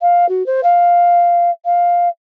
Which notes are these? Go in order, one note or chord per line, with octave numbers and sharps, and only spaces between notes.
F5
F#4
C5
F5
F5